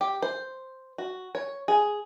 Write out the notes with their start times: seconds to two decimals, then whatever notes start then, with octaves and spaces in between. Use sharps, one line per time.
0.01 G4
0.22 C5
0.98 F#4
1.35 C#5
1.68 G#4